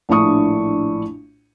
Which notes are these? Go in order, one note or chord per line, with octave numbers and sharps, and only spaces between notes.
A#1 A2 D4 E4 C#6 D#6